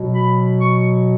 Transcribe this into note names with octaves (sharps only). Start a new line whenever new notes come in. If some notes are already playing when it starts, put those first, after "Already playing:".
Already playing: B2 F#3
B5
C#6